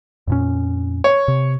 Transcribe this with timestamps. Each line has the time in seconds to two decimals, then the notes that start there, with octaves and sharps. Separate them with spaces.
0.27 F2 A#2 C#4
1.04 C#5
1.28 C3